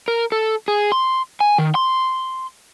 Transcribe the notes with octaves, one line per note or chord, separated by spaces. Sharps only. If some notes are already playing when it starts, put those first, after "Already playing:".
A#4
A4
G#4
C6
G#5
D#3
C6